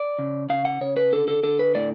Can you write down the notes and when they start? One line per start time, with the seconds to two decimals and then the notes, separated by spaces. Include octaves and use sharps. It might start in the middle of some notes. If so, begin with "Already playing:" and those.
Already playing: D5
0.19 C#3
0.50 C#3 F5
0.65 F#5
0.81 C#3 C#5
0.97 B4
1.12 D3 A4
1.28 A4
1.43 D3 A4
1.59 B4
1.75 A2 D5